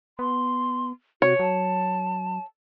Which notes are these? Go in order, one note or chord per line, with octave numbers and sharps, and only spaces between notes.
B3 C6
C3 F#4 C#5
F#3 A5